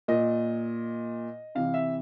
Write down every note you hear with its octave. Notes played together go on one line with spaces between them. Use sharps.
A#2 D#5
C3 E3 F5
E5